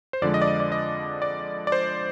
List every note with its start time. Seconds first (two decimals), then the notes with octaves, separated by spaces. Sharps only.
0.13 C5
0.22 F2 D3 F3 G#3 D5
0.34 D#5
0.42 D5
0.47 D#5
0.60 D5
0.72 D#5
1.22 D5
1.67 D5
1.72 C5